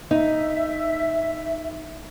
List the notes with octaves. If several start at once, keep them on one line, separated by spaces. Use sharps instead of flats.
D#4 E5